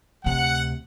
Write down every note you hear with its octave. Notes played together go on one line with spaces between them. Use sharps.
D2 C3 F#5